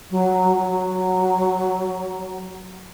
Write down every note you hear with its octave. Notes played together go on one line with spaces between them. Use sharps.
F#3
F#3